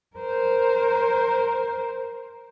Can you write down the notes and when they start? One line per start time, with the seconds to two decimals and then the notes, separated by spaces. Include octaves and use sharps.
0.17 A#4 C5